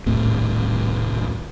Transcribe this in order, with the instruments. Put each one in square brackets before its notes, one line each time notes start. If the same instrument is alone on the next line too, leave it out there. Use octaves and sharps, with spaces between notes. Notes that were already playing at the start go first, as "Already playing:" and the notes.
[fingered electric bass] D#1 C2 A2 C3